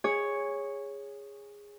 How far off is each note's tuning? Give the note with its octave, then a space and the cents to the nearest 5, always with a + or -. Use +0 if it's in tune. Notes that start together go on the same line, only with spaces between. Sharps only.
G#4 -15 C#5 +0